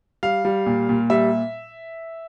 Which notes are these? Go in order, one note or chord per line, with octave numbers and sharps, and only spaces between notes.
G3 F5
G3
A#2
A#2
G3 E5